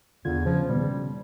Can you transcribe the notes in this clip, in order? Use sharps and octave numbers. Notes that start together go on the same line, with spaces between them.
E2 D3 F4 G#6
C#3 F3
B2 D#3 G3 B3
C#3